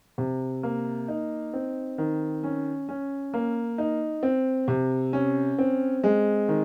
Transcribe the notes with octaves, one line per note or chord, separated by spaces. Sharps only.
C3
A#3
D#4
C4
D#3
C#4
C#4
A#3
D#4
C4
C3
C#4
C4
G#3
D#3